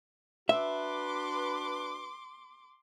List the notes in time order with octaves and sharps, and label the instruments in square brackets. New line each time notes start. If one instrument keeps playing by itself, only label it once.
[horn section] D4 F#4 B4 [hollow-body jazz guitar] E5 [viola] C6 D6